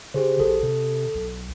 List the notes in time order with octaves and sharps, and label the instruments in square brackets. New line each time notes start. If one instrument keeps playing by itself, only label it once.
[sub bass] C#3 [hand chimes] G4 G#4 C5
[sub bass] A#1 [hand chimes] A4
[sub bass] C3
B1